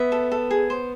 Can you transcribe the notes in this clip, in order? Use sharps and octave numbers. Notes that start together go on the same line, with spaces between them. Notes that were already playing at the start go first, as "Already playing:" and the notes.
Already playing: B3 E5
A4
A4
G#4
C5